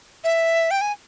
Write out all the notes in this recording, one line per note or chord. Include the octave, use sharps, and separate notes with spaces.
E5
G5
G#5